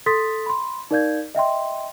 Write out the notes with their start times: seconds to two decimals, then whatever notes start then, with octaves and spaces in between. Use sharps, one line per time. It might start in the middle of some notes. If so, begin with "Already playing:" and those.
0.06 A4 C6 D#6 A6 B6
0.46 B5 C6
0.91 D#4 A#4 D5 F5 G6 G#6
1.35 D#5 E5 G5 C6